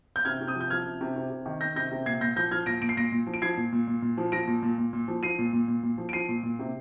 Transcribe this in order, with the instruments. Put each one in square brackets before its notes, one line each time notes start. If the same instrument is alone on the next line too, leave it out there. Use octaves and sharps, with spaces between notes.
[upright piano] G6
C3 F6 G#6
C3
D#6 G6
F3
G6
F3 F6 G#6
C3
C3
C3
C3
D#3
D#3 G6 A#6
C3 G6 A#6
C3
A#2 G#6 C7
A#2 G6 A#6
F3 G6 A#6
F3 F6 G#6
A#2 A#6 D7
A#2 D7
C7
A#2 A#6 D7
A#2
F3
D7
F3 G#6 C7
A#2
A#2
A#2
A#2
F3
F3 A#6 D7
A#2
A#2
A#2
A#2
F3
F3 C7 D#7
A#2
A#2
A#2
A#2
F3
D7
F3 C7 D#7
A#2
A#2
C3